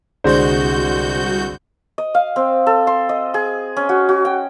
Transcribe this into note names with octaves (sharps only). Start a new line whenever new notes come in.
C2 D3 G#3 F#4 C5 G6
D#5
F5
C4
A4
C6
D#5
G#4
C#4
F#4
F#4
G5